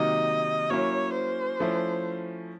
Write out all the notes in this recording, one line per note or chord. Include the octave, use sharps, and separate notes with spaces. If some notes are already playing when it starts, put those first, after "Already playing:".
Already playing: C3 D#3 F#3 A#3 D#4 D#5
F#3 A#3 C#4 E4 C#5
C5
F3 A3 C#4 E4